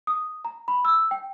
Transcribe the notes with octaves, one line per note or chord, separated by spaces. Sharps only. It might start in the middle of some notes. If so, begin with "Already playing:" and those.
D#6
A#5
B5
E6
G5